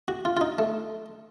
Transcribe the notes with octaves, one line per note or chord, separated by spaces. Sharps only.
F#4
F4
F4
D#4
A3